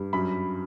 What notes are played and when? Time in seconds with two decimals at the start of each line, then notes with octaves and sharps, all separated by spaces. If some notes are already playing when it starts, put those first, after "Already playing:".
Already playing: G2
0.13 F#2 B5